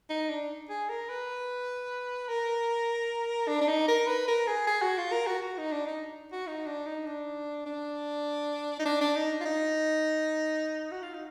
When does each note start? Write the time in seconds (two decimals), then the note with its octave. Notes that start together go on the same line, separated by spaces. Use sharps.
0.09 D#4
0.29 D4
0.69 G#4
0.89 A#4
1.09 B4
2.29 A#4
3.48 D4
3.61 D4
3.68 D#4
3.88 A#4
4.07 B4
4.28 A#4
4.47 G#4
4.67 G#4
4.82 F#4
4.98 F4
5.12 A#4
5.27 F#4
5.42 F#4
5.57 D#4
5.72 D4
5.87 D#4
6.32 F#4
6.47 D#4
6.66 D4
6.86 D#4
7.06 D4
7.66 D4
8.79 D#4
8.85 D4
9.01 D4
9.16 D#4
9.40 F4
9.45 D#4
10.91 F#4
11.02 F4
11.14 D#4